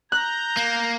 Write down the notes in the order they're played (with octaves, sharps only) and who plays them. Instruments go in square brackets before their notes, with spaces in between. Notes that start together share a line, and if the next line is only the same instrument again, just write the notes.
[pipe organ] A#5 [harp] F#6 [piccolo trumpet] G6
[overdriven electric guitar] A#3